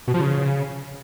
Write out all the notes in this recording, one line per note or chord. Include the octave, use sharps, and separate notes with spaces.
B2
F3
C#3